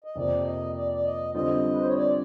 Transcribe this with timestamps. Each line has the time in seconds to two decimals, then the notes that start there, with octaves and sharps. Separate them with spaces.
0.04 D#5
0.15 F2 C3 F3 A#3 D5
0.45 D#5
0.76 D5
0.92 D5
1.04 D#5
1.34 D3 G3 C4 F4 D#5
1.71 B4
1.79 C5
1.86 C#5
1.94 D5